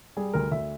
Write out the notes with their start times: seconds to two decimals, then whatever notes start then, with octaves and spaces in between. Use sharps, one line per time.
0.17 G3 G#4
0.33 D2 A#4
0.51 D2 E5